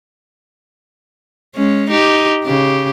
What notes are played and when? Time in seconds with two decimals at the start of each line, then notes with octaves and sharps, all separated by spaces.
1.55 G#3 C#4
1.90 D#4 G4
2.45 C#3 G4